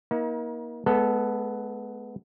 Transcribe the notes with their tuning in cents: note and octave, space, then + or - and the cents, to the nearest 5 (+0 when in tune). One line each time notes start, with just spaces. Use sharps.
A#3 +30 D#4 +40
G#3 +35 B3 +0 A4 +0